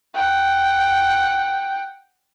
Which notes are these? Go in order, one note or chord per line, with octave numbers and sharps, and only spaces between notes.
F#5 G5